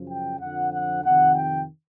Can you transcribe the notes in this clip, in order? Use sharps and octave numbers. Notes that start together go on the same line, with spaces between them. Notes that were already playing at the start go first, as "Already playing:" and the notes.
Already playing: F#2 C#3 F3
G5
F2 D3 F3 F#5
F#5
F2 C3 D#3 F#5
G5